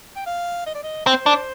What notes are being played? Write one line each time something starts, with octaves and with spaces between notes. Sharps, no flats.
G5
F5
D#5
D5
D#5
C4 C5
D4